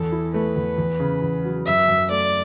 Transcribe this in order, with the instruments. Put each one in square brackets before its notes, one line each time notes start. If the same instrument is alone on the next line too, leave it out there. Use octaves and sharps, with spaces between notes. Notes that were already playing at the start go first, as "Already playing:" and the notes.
Already playing: [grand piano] E2 [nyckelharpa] A4
[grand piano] E4
[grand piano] A3 [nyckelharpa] B4
[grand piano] E2
E2
C#3
E2
F#3
[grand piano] F#2 [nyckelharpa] E5
[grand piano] F#2
[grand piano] A3 [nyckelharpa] D5